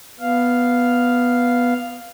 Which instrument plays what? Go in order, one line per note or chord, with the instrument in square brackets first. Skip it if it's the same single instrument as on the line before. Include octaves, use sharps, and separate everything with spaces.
[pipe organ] B3 F5